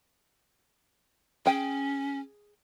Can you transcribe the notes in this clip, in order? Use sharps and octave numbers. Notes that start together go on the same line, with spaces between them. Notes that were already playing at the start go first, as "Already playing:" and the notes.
C#4 G#4 G5